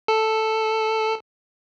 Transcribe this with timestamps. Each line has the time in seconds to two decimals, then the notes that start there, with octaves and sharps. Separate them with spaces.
0.08 A4